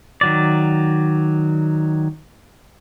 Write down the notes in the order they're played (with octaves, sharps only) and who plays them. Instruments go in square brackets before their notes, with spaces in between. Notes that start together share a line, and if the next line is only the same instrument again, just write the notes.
[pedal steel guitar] D#3 F#3 D5